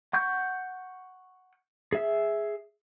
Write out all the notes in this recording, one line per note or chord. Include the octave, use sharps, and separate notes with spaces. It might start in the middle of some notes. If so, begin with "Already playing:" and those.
F#5 C#6 G6
G#4 E5